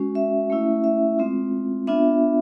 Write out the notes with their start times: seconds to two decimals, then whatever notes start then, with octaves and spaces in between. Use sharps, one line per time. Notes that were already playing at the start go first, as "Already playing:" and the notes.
Already playing: G#3 C#4 F#4
0.15 E5
0.50 A3 C#4 E4
0.84 E5
1.19 G#3 C4 F4
1.87 B3 D4 F4 E5